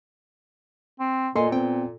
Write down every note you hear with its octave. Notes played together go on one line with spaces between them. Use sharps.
C4
A#2 A#3 A4 D#5 G#5 C6
B3 C4 G5